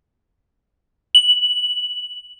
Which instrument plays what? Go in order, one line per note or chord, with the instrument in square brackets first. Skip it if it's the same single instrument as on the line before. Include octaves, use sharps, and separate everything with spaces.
[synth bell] F#7